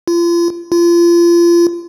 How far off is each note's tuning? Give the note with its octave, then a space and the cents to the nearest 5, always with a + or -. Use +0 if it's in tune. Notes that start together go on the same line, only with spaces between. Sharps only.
F4 -35
F4 -30